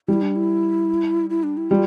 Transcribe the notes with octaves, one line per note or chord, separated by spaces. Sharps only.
G3 E4
D4
E4
E4
D4
E4
G3 F4